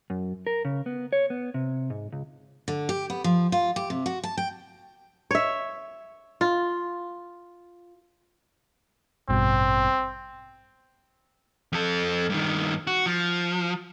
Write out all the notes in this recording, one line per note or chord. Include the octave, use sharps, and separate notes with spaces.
F#2
A#4
C#3
B3
C#5
B3
C3
G#2
C#2
D3
G4
B3
F3
F4
G4
C3
F#4
A5
G5
C#5 E5
F4
A1 G2 B2 C4
F2 A4
G2 D#3
F#4
F3